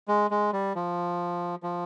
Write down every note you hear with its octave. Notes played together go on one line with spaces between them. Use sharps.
G#3
G#3
G3
F3
F3